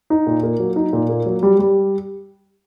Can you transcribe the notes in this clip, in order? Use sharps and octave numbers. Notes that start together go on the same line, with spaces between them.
D#4
A#2
A#3
F#3
D#4
A#2
A#3
F#3
G3
G3